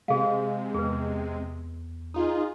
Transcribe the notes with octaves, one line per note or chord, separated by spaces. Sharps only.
C3 G#3 G#4 F5
E2 G#4 B4
D#4 F4 G#4